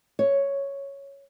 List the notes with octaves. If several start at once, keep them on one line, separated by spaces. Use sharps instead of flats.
C#5